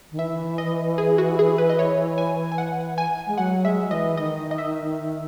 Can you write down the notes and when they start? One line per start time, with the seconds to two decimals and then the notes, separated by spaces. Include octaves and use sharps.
0.12 D#3
0.18 E3 E5
0.58 D#5
0.98 G#4
1.18 F#4
1.39 G#4
1.58 B4
1.69 D#5
1.79 C#5
2.18 G#5
2.52 G#5
2.58 F#5
2.98 G#5
3.27 G#3
3.38 F#3 F#5
3.65 G#3 E5
3.91 E3 D#5
4.17 D#3 D#5
4.51 D#5
4.58 E5